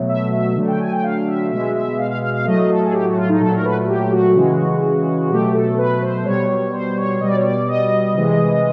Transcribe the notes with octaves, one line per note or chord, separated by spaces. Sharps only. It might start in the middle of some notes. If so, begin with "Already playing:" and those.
Already playing: B2 F#3 A3
E5
E5
D3 F#3 A3
G5
G#5
G5
F5
E5
B2 G#3 E5
E5
F5
F5
F5
F5
A2 F#3 A3 D#5
A4
G#4
G4
F#4
F4
D#4
A#2 F#3 A3 A4
A#4
B4
G4
F#4
C#3 E3 G#3
B2 F#3 A3 G4
A4
B4
C5
B2 G3 C#5
C5
C#5
B2 G3 D5 D#5
C#5
D5
D#5
C3 E3 G#3